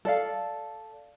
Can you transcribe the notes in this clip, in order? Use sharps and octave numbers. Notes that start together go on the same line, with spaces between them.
A4 D5 F5